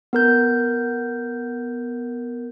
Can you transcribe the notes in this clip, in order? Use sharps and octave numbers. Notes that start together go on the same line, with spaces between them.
B3 A#4 G6